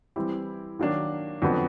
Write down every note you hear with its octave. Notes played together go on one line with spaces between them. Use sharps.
E3 G3 C4 E4 G4
D#3 F#3 A#3 D4
F2 D3 F#3 B3